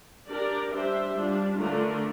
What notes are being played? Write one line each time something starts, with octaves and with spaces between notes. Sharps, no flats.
D4 G4 A#4 D5
G3 D4 G4 C5 E5
G3 D4 F4
D3 A3 D4 F4 A#4